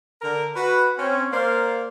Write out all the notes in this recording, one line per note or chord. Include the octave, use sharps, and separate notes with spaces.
D3 A#4
F#4 B4
C4 C#4
A#3 A#4 C5 D5 F5